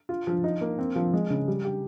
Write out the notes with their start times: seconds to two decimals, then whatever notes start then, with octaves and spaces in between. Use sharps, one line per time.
0.09 F4
0.27 F3
0.44 D#4
0.61 A#3
0.79 C4
0.96 F3
1.14 G#3
1.30 C#3
1.48 G3
1.65 G4